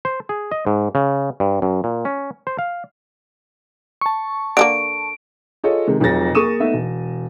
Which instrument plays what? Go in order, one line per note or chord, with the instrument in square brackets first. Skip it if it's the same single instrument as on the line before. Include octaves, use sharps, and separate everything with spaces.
[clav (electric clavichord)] C5
G#4
D#5
G#2
C#3
G2
F#2
A#2
C#4
C5
F5
[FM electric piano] A5 C#6
[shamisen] D3 A3 A#3 [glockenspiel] D7
[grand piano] F4 G#4 A4 C#5 D#5
C3 D#3 G#3
F1 F2 F#3 G#4 A6 A#6
A#3 G#4 C#6 D#6 D#7 E7
A3 B3 D#4 E5
E1